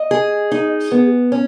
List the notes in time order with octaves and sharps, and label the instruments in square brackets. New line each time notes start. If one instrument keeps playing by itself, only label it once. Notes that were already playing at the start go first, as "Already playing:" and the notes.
Already playing: [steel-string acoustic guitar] D#5
G#4
D#4
B3
C#4